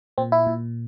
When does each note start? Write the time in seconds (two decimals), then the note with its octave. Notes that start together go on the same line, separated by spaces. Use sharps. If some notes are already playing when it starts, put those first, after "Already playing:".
0.18 A#2 C4
0.32 E4
0.47 A#2